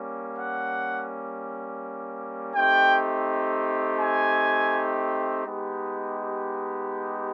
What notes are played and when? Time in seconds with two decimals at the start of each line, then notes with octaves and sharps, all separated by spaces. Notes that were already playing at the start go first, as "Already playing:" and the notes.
Already playing: G3 A#3 C#4
0.37 F#5
2.54 A3 C4 D#4 G4 G5
4.00 G#5
5.45 G#3 B3 D#4 G4